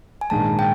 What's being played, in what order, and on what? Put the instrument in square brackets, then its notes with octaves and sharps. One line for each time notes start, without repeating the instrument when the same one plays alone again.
[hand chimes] G#5
[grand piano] A#1 G#2 D#3 G#3 [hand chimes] A5
[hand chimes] G5